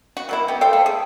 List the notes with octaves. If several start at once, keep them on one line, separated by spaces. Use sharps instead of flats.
F#4
F#3 A#3 E4
B3 G4
A4 C5 F5 G5
A3
G#4